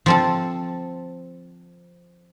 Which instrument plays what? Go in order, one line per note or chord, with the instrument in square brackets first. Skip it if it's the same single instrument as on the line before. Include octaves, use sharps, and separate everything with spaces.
[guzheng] F3 C4 A4